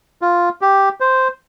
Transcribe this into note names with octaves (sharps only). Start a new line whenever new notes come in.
F4
G4
C5